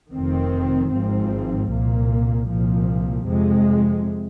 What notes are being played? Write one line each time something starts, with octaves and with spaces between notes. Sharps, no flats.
F1 F2 D#3 C4
G#1 G#2 F3 C4
C2 A#2 A#3
C2 A#2 F3
F2 C3 G#3